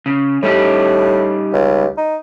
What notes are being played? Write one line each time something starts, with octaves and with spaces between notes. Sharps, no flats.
C#3
A2 G3 D#4 G4
C#2
D#4